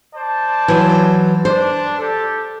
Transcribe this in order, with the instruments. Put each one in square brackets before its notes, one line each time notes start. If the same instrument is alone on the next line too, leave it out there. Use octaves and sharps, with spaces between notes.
[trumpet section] C5 D5 A5
[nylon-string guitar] E3 F#3
[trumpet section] D4 [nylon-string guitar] C5
[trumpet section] G4 A4